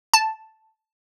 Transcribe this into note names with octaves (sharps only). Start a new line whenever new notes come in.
A5